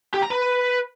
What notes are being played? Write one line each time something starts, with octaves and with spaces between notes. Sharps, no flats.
G4
A#5
B4